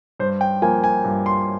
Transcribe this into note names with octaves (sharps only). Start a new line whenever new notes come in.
G2 C5
G5
F3 A#3 G#5
G#5
G2
C6